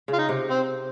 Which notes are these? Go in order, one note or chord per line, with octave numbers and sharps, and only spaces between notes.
C#3
F4
D#4
C3
C4